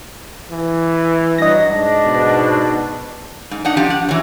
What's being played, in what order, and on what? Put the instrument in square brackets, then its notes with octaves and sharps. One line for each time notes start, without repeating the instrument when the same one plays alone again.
[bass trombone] E3
[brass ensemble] G2 F#3 [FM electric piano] D#5 A#6
[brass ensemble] G#2 D4
[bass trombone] B2
[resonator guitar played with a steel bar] G#2
D4 D#4 F#5
F3 D4 G4
F#5
E3 F#3